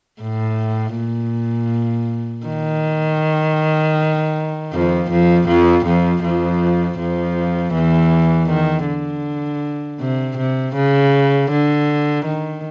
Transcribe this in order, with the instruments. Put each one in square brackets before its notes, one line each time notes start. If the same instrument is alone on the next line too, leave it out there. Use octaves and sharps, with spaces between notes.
[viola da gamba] A2
A#2
D#3
F2 F3
F2 F3
F2 F3
F2 F3
F2 F3
F2 F3
E2 E3
D#3
D3
C3
C3
C#3
D3
D#3